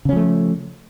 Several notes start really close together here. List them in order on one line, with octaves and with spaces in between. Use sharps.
C#3 C#4 F3 A3